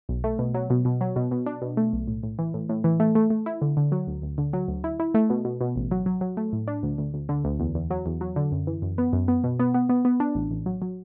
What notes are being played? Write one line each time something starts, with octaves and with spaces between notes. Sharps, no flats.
B1
A3
B2
F#3
B2
B2
F#3
B2
B2
D4
B2
A3
B1
A2
A2
E3
A2
A2
E3
A3
A3
A3
E4
D3
D3
F#3
D2
D2
D3
F#3
D2
E4
E4
A3
B2
B2
B2
A1
F#3
F#3
F#3
A3
A2
D4
D2
D2
D2
D3
D2
E2
E2
F#3
E2
F#3
D3
F#2
E3
F#2
B3
F#2
B3
B2
B3
B3
B3
B3
D4
A1
A1
F#3
F#3